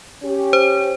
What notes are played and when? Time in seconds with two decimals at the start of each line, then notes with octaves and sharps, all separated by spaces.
0.23 C#4 G4
0.53 C5